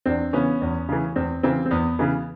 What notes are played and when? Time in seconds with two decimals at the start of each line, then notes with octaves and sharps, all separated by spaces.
0.06 E2 C4 D4
0.33 C#3 E3 B3 C#4
0.62 E2
0.89 C#3 E3
1.16 E2 C4
1.43 C#3 E3 C4
1.66 C4
1.71 E2 B3
1.99 C#3 E3